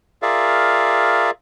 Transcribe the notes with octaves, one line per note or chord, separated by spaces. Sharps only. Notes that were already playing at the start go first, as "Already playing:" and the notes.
F4 G#4 A#4 D5 E5 F5